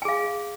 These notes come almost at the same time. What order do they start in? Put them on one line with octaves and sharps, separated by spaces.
G#5 G#4 F5